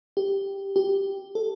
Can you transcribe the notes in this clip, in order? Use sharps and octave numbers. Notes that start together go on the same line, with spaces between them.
G4
G4
A4